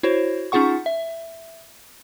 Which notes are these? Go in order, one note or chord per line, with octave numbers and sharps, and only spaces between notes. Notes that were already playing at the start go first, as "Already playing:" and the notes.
E4 F#4 C5 C#5
C#4 D#4 F4 G#4 F#5 C#6
E5